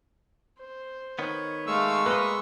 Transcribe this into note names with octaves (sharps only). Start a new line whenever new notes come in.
C5
D#3 B3 C#5
G#3 A3 F5 C#6 E6
A#3 B3 B4 D#5